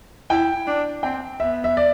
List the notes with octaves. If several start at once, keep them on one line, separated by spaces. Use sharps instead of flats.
E4 G5
D4
C4 G5
B3 E5
E5
D5